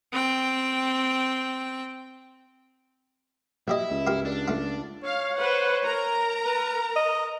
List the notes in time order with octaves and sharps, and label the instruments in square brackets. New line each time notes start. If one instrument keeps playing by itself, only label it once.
[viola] C4 G5
[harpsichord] A#1 G4 D#5 [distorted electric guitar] E4
[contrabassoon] C#2
[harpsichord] F4 G4 A#4
[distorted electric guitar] D4
[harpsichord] A3 F4
[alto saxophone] C#5 [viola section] F5
[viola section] B4 C5 F#5
A#4 A#5
[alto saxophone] B4
D#5